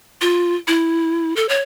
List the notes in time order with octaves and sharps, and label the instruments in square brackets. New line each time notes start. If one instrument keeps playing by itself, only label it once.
[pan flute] F4
E4
A4
C#5